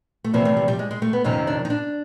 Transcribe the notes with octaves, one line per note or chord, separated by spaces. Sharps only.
A3
E2 C3 F3 A#3
A3
G3
G3
G#3
G#3
A3
B3
F2 C3 D#3 C#4
D4
D#4
D4